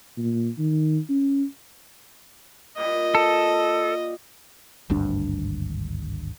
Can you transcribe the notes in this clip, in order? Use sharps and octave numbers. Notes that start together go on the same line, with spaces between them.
A#2
D#3
C#4
A#2 G3 D#5 B5
A4
G#1 D2 G2 D4